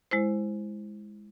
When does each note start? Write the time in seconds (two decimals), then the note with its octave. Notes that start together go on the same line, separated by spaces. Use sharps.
0.11 G#3 E4 C5